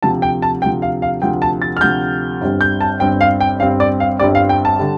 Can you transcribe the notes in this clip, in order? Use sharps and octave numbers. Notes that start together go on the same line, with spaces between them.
D2 C3 F3 A5
G5
A5
D2 C3 F3 G5
F5
F5
D2 C3 F3 G5
A5
A6
F6
D2 C3 F3 G6
G1 G2 G3 C4
G6
A5
G1 G2 G3 C4 G5
F5
G5
G1 G2 G3 C4 F5
D5
F5
G1 G2 G3 C4 D5
F5
G5
A5
D3 G3